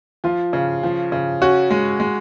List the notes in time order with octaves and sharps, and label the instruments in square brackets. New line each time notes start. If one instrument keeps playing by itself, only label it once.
[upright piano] F3 [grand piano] F4
[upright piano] C#3
F3
C#3
[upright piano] C#4 [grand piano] F#4
[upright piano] G#3
G#3